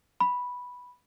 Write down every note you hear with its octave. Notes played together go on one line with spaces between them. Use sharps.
B5